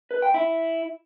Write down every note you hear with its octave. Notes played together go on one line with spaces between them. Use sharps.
B4
G5
E4